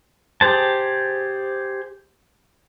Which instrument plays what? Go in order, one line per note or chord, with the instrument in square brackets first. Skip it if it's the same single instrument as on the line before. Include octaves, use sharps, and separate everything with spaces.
[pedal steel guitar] G4 G#4 C5 A5